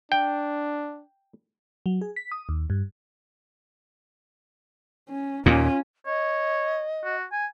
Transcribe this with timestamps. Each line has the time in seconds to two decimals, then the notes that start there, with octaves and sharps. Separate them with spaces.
0.12 D4 G5
1.86 F#3
2.01 G#4
2.16 B6
2.32 D#6
2.49 D#2
2.70 G2
5.09 C#4
5.46 D#2 A#2 C#4 F4
6.06 C#5 D#5
7.04 F#4
7.32 G#5